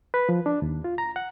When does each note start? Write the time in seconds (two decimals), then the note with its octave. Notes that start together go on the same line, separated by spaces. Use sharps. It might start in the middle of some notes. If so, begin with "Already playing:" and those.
0.14 B4
0.29 F3
0.46 D4
0.62 D#2
0.84 F4
0.98 A#5
1.16 F#5